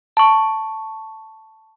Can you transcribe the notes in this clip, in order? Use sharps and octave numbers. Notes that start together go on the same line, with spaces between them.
A5 C#6